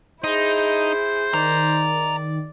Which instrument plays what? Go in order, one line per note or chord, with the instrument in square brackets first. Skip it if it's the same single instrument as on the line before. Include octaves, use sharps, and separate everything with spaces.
[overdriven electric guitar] D#4 [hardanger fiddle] E4 G#4 [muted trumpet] C5
[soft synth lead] D#3 [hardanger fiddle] D5 [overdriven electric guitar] A#5